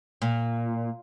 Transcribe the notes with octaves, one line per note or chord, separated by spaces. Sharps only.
A#2